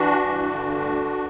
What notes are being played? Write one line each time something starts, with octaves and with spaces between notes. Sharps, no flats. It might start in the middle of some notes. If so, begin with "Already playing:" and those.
Already playing: E3 D4 F#4
G2
D3
D2